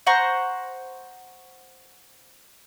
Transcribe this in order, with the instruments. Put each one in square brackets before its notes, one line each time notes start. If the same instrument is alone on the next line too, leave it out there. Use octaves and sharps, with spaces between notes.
[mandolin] C5 F#5 A#5 C#6